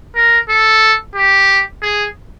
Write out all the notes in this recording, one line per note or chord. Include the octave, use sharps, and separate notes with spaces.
A#4
A4
G4
G#4